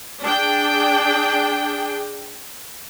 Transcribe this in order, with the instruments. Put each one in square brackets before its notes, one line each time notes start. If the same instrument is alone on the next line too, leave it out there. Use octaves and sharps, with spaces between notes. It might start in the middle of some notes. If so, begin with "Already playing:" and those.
[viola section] D4 G#4 G5